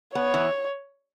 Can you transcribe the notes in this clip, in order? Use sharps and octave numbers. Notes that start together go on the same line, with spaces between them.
B3 C#5
E3